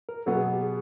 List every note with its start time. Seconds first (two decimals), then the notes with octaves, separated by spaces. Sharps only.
0.09 A#4
0.26 B2 F#3 B3 A4
0.35 G#4
0.53 G4
0.62 G#4